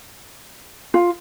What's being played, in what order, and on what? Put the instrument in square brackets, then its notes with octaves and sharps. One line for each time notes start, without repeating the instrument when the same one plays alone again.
[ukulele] F4